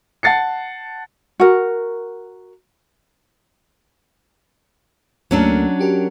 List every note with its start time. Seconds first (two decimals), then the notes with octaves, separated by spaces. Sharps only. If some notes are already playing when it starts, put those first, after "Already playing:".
0.23 F#5 A5 A6 C7 C#7
1.40 F#4 A#4
5.31 D2 F#3 A3 A#3 C#4 D4
5.79 F#4 G4 A#4